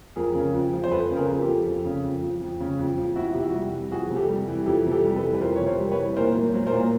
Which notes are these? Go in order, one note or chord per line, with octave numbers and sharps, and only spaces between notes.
F2 G#4 A#4
C#3
F2
F3
C5
F2 A4 B4
C#3
G#4 A#4
F2
G4 A4
F3
F2
C#3
F2
F3
F2
C#3
F2
F3
F2 E4 F#4
C3 G4
E4 F#4
G3
E3
F2 F#4 G#4
C3
G4 A4
G3
E3
F2 G4 A4
C3
G4 A4
G3
A4 B4
E3
B4
F2 A#4 C5
C#5
C3
A#4 C5
G3
B4 C#5
E3
A#2 A#4 C5
F#3
F#3
A#4 C5
A#2